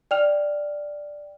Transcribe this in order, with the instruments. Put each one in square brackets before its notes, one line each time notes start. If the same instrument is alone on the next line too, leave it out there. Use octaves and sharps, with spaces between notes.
[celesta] D5 G5 F6 F7